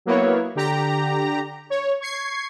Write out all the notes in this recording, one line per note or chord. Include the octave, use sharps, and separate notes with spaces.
F#3 A#3 B3 E4 C#5
D3 G4 A#5
C#5
C#6 G#6 C7